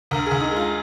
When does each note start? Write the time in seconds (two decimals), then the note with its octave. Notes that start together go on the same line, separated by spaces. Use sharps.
0.11 D2 A#4
0.26 G#4
0.31 D2
0.41 D#4
0.51 G#3
0.56 F4